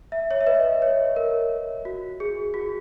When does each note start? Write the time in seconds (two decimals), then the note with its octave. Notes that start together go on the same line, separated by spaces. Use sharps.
0.12 E5
0.31 C#5 E5
0.41 E5
0.47 B4 D#5
0.82 C#5
1.16 A#4
1.85 F#4
2.20 G#4
2.54 F#4